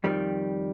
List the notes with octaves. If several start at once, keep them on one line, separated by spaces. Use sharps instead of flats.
F2 D#3 G3